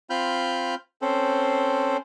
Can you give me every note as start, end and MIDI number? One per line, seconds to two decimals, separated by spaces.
0.10 0.75 60
0.10 0.75 65
0.10 0.75 83
0.10 0.75 89
0.10 0.75 91
1.02 1.97 60
1.02 1.97 61
1.02 1.97 69
1.02 1.97 72